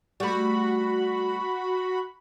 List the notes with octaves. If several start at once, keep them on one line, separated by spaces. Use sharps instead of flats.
G3 A3 F#4 B5